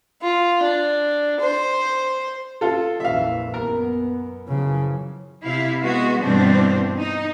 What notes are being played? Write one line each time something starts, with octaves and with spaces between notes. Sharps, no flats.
F4
D4
C5
F4 A4
A#1 F2 E3 E5 F5
F#2 B3 A#4
F#2 C#3 E3 F3
C3 E4 F5
G#3 B3 F#4
G2 B2 E3 C4 D4
D#4